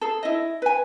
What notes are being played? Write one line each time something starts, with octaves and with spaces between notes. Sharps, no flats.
G#4 A4
E4 D#5
B4 G#5